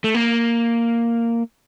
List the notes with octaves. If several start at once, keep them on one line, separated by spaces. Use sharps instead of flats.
A3
A#3